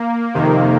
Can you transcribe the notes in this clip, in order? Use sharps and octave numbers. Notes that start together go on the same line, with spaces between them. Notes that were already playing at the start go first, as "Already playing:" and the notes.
Already playing: A#3
F2 C3 D#3